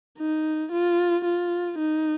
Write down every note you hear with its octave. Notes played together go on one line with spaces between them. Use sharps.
D#4
F4
F4
D#4